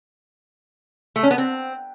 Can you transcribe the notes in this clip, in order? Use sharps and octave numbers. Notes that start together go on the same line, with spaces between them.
A3
C#4
B3
C4